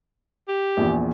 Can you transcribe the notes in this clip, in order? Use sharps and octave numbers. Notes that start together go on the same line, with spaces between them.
G4
A#1 E2